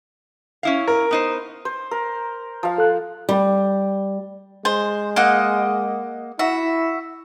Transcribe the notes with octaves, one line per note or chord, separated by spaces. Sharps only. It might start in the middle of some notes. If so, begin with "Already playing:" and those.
C#4 E4 F5
A#4
B3 D#4 C5
C5
A#4
F3 F5
A4 F#6
G3
G#3 C5
A#3 D#5 F#5
E4 F#4 E5